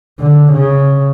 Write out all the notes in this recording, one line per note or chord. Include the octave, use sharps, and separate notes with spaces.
D3
C#3